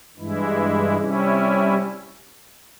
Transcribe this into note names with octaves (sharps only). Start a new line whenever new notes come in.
G2 E3 G#3 E4
C3 G3 C#4 E4